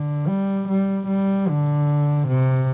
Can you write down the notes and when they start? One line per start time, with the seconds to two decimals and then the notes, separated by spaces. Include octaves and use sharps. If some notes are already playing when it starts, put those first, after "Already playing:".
Already playing: D3
0.28 G3
0.69 G3
1.08 G3
1.49 D3
2.28 C3